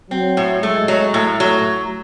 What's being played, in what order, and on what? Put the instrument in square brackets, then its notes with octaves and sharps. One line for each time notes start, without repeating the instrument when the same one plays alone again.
[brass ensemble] F#3 [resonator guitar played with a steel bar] C4
[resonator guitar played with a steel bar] A2
[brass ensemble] G#3 [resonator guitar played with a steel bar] A3
[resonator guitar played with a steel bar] F#3
[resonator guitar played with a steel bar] A2 [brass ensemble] A3
[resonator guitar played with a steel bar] F#3